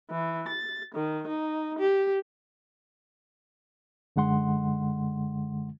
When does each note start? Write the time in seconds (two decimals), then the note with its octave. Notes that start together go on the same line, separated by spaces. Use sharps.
0.11 E3
0.48 A6
0.95 D#3
1.29 D#4
1.79 G4
4.16 F#2 D3 G#3 F#5 C6